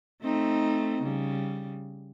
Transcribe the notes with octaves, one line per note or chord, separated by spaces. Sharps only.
A3 C4 D#4
C#3 G3